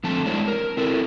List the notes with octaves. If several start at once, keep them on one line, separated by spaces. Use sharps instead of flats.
D3 F3 A3 C4 A5
G#3 D4 E4 C5 C#5
A#4
C4 E4 A4 A#4